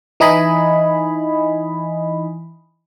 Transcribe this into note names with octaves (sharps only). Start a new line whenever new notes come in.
E3 D#4 E4 D#5 G#5 B5